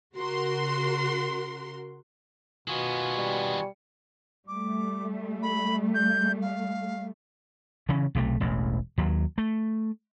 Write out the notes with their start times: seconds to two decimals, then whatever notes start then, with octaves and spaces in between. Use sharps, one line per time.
0.15 C#3 F#4 A#4 C6
2.68 B2 D#3 B3 F4 F#4 G#5
3.16 G3
4.48 G3 A3 D6
5.42 B5
5.95 G6
6.42 F5
7.89 C#3 E3 C#4
8.15 B1 C3 E3 A3
8.40 E1 A1 E2
8.98 D#2 F#3
9.38 A3